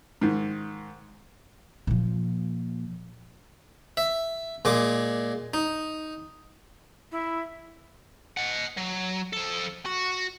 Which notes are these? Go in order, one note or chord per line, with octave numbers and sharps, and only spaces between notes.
G#2 D#3
A#2 F3
E5
A#2 G#3 D6
D#4
E4
D#5 F#5
F#3
F3 A4
F#4